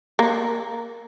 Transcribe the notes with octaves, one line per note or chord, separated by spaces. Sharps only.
A#3